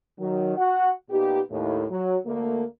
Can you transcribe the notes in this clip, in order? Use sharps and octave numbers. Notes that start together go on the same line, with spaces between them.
D#3 F#3
F#4 F#5
A#2 B3 D#4 G4
D#2 A2
F#3
D2 D3 A3 A#3